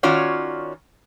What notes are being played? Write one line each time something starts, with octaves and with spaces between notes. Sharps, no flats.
D#3 C#4 F4 F#4 C#5 D5